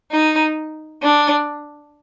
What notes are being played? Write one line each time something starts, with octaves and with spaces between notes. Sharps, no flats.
D#4
D4